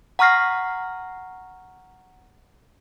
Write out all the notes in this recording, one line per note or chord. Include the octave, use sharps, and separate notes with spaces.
F#5 A#5 C#6 F6 A#6 C7